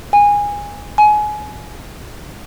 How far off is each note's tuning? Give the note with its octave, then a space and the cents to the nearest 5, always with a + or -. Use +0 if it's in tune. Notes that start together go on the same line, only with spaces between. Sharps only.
G#5 -20
G#5 +25